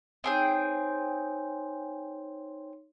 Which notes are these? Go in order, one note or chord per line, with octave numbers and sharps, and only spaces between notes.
C4 D#4 G#4 C#5 G5 C6